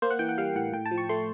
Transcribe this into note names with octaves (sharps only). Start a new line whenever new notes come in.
A#3 C5
F#5
E3 G5
F#5
G3 F5
A2 F#5
A2 G5
A5
F3
C#6
A3 C6